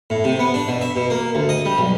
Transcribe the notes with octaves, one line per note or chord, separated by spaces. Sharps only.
A2
C3
B3
D4
B2
E5
B2
A#3
D2
D#5
G3
B1